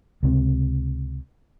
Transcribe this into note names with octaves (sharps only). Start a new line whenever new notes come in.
C#2 C3